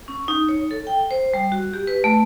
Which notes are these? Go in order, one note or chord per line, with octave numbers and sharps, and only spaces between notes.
C#4
D#4
C#5
A4
G5
C5
G3
F#4
G4
B4
A3